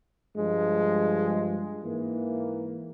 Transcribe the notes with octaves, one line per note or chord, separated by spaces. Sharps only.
G2 F3 G#3
G#2 E3 A#3